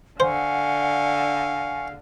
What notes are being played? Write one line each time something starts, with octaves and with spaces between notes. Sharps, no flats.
D3 C5 F5 F#5 G#5 C#6